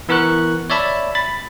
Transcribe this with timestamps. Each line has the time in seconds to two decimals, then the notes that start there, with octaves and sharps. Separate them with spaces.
0.09 E3 B3 A#4 C#6 F#6
0.70 C#5 D5 E5 A5 B5
1.15 B5 A6